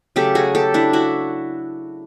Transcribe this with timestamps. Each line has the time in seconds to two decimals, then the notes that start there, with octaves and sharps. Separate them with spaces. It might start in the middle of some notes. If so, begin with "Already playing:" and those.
0.16 C#3 F#3 A3 G4 A4
0.35 F#4 G#4
0.55 G4 A4
0.74 D4 E4
0.93 E4 F#4